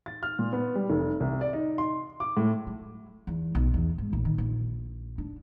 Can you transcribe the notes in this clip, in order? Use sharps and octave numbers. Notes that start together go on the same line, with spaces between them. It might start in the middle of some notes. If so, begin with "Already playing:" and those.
A6
F6
A#2
B3
G3
F1
C2
D5
D#4
C6
D6
A2
F#3
E2
B1
E2
G#2
A#1
D#3
A#1
D4